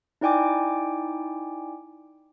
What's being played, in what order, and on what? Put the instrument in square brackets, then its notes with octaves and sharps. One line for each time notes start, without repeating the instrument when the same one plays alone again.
[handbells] D#4 E4 D5 G5 G#5 D6